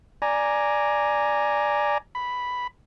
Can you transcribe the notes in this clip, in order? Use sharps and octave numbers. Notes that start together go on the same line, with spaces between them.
D5 G#5 A#5
B5